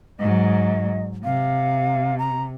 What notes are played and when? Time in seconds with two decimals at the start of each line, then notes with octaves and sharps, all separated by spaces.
0.19 G#2 F#3 D#5
1.24 C3 F5
2.19 A#5